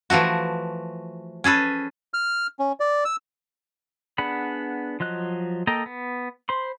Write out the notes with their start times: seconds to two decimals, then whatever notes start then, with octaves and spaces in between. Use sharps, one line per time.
0.10 E3 F3 A3 F#4
1.44 C#4 G#4 A4 B4
2.14 F6
2.59 C#4
2.80 D5
3.05 E6
4.18 B3 D4 G#4 F#5 B5
5.00 F3 F#3 D#5 F#6
5.67 A#3 A4 D#5 G5 A#5
5.86 B3
6.49 C5 B5 C6